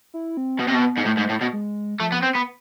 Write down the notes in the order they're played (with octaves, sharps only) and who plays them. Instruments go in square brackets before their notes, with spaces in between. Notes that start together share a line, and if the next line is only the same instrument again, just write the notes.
[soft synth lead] E4
C4
[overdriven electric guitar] B2 [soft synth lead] B3
[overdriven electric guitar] C3
B2
G#2
[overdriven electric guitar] A2 [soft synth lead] A3
[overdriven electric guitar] G#2
A2
B2
[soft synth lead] G#3
[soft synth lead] F3 [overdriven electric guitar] A3
[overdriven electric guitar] B3
C4
B3